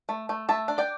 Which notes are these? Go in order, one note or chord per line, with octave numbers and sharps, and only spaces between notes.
A3
A3
A3 E5 A5
D4
D5 G5